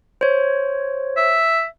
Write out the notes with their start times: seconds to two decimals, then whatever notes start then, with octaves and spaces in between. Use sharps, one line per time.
0.21 C5 C#5
1.17 E5